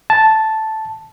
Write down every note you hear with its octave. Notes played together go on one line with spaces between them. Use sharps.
A5